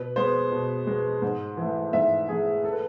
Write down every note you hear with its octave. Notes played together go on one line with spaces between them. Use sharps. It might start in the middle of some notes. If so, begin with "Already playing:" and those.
Already playing: B2 B4
G#3 B3 C5
B2
G#3 B3
G#2
E3 A3
G#2 E5
E3 A3 G#4
A4
B4